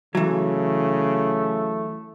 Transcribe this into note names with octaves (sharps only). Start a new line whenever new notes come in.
C#3 E3 F#3 A3